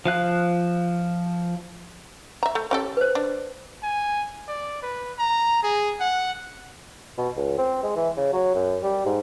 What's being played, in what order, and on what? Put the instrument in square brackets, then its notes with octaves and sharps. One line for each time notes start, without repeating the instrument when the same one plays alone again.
[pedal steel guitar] F3 F5 F#6
[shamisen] E5 A#5
A3
C#4 G4 A4
[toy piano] B4 C5
[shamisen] D4
[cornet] G#5
D5
B4
A#5
G#4
F#5
[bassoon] B2
C#2
C4
G#3
E3
C#3
F#3
F#2
G3
G#2